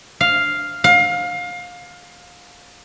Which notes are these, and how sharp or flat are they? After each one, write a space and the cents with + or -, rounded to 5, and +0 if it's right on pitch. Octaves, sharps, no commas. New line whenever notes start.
F5 +0
F5 +25